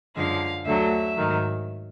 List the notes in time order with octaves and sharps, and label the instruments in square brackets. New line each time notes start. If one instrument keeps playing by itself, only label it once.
[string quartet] F#2 D3 F3 G#3 F5
D2 D3 F#3 E5
G#2 D#3 F#3